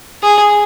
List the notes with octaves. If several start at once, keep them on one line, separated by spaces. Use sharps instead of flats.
G#4